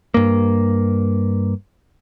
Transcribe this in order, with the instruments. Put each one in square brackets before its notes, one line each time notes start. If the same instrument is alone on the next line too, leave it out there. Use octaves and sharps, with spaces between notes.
[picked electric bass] G2 A#3